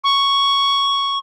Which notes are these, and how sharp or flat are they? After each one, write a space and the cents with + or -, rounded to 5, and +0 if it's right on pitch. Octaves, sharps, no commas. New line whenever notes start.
C#6 +5